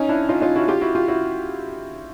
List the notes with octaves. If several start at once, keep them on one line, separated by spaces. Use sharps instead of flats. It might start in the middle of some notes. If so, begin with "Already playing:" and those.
Already playing: C#4 D#4
D4 E4
D#4 F4
D#4 F4
E4 F#4
F4 G4
E4 F#4
F4 G4
E4 F#4